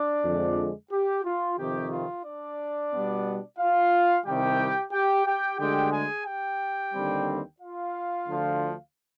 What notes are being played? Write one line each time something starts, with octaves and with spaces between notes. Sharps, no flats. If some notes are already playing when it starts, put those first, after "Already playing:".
Already playing: D4 D5
F2 D3 F3 G#3
G4
F4
F2 C3 D#3 G4
F4
D4 D5
B2 G3 B3
F4 F5
C2 C3 D#3 G3 G4 G5
G4 G5
G4 G5
D2 D3 G#3 G4 G5
G#4 G#5
G4 G5
D#2 D3 G3 C4
F4 F5
D2 D3 F3